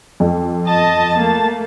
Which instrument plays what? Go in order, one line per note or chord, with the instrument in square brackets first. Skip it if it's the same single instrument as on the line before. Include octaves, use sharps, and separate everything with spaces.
[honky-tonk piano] F2
[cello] D#5 [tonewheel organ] A5
[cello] A3 A#3